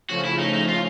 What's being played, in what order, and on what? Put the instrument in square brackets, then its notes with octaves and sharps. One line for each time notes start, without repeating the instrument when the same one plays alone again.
[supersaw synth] C#3 F3 A3 C#4 [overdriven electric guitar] F#4
[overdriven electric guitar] E4
D#4
D#4
F4